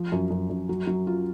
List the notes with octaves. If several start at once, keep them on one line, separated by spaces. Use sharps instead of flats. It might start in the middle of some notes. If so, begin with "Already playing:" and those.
Already playing: F3
F#2
F#2
F#2
F#3
F#3
F4